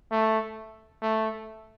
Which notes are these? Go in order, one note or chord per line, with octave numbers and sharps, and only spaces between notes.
A3
A3